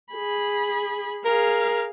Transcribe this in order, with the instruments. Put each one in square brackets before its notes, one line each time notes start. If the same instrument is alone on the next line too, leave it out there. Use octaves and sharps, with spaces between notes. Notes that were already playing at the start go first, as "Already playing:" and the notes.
[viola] G#4 B5
[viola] G#4 F5 [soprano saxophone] A#4